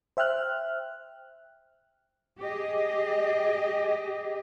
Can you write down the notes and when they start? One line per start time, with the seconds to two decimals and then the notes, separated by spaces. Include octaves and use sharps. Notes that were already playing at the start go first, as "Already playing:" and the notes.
0.17 C5 E5 G5 F6 F#6
2.40 G4 G#4 D#5